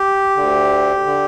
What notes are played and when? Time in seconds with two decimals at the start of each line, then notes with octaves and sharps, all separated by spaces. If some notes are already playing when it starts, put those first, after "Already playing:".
Already playing: G4
0.37 D2 D3
1.06 D3